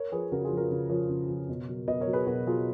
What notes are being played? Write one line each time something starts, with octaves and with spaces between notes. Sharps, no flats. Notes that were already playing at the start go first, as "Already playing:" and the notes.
Already playing: A#4 C#5
F3 G#4 B4
C#3 F#4 A#4
F4 G#4
F3
F#4 A#4
C#3
F3 A#4 C#5
C#3
F3
B2
F#3
B2 B4 D#5
A#4 C#5
F#3
G#4 B4
B2 F#4 A#4
F#3 F4 G#4